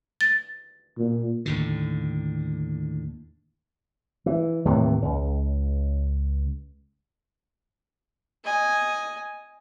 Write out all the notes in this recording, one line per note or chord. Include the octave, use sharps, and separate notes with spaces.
A6
A#2
D#2 A2 D3
E3
D#2 A2 C3 E3
C#2
D#5 G#5